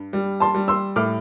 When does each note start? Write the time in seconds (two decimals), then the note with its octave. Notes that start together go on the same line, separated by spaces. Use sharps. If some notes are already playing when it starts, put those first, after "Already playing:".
Already playing: G2
0.13 G3
0.40 A5 C6
0.55 G3
0.68 C6 E6
0.96 A2 D6 F6